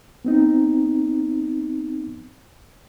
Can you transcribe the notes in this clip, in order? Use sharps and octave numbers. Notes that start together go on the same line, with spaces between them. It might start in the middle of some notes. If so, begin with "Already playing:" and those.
B3 C4 D#4